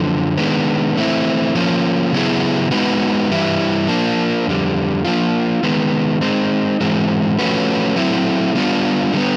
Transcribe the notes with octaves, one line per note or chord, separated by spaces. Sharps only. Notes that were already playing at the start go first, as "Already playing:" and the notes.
Already playing: F#2 D3 F3
D#3 G#3 B3 D4
E3 A3 C4 E4
F3 A#3 C#4
C#3 F#3 B3 E4 G#4
G#3 B3 D#4 F#4 B4
G2 E3 G3 E4
F3 A#3 D4
F2 D3 G3
F3 A#3 D4 F4
D#3 G#3 B3
G#3 C4 D#4
G#2 E3 G#3 C4
F3 A3 C#4 F#4 B4
F#3 A3 C4 E4
G3 B3 D4 F4
D3 G3 B3